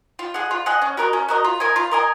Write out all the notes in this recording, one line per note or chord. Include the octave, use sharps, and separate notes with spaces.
F4
G#4 D#5 F#5
F4
G#4 D#5 F#5
C#4
F#4 A#4 D#5
C#4
F#4 A#4 D#5
F4
A#4 D#5 G#5
F4
A#4 D#5 G#5